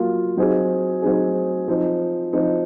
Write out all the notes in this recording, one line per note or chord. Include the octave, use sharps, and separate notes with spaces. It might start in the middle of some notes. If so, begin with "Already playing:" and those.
Already playing: F#3 A#3 F4
F#3 C4 D#4 G#4
F#3 C4 D#4 G#4
F3 C4 D#4
F3 C4 D#4